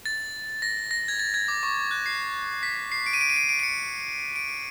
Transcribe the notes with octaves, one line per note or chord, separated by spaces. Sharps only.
A6
A#6
A#6
G#6
A6
G#6
D6
C#6
F#6
C7
B6
C7
D7
D#7
D7
D#7
D7
D7
D7
C#7
D7